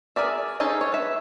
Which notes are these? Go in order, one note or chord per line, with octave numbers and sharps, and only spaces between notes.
G#4 A#4 D5 E5
C#4 D#4 G#4 A4 C5
C#5
B4 E5